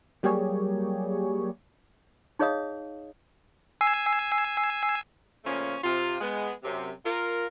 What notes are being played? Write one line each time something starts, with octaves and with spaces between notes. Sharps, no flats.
F#3 G3 A#3 G4 G#4 C#5
D#4 G#4 C#5 D#5 F5 D#6
G#5 E6 C7
A#2 C#3 F3 A3 C#4
C3 F4
G#3 B3
F#2 C3
F4 A#4